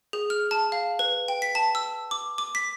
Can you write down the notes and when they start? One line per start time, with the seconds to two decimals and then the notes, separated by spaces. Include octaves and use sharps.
0.13 G#4
0.30 F6
0.51 A5
0.72 F5
0.99 B4
1.28 G5
1.42 B6
1.55 A5
1.75 E6
2.11 D6
2.38 D6
2.55 B6